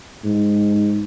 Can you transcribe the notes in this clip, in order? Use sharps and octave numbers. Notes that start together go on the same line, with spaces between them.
G#2